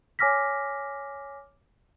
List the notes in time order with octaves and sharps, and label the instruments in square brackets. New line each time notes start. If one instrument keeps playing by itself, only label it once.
[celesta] C#5 G#5 D6 F6 A#6 B6